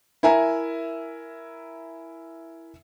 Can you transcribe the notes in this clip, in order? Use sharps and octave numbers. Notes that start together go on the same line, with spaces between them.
E4 A#4 E5 G#5 A#5